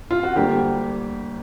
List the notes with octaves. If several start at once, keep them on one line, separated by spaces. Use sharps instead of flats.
F4
F#4
D2 D3 G3 A#3 G4